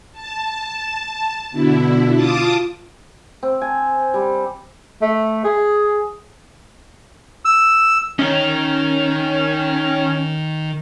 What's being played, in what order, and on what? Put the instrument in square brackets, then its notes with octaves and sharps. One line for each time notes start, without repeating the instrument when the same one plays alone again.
[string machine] A5
B2 D3 E4
F4 A5 D6 D#6
[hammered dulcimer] C4
G#5
G3
[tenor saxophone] A3
G#4
[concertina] E6
[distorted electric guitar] D#3 D#5 [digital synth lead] C#4